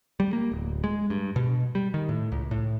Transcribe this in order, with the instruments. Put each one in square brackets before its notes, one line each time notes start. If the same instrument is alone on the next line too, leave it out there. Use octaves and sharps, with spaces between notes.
[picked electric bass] G3
A#3
D1
G#3
G2
B2
G3
D#3
A2
C#2
A2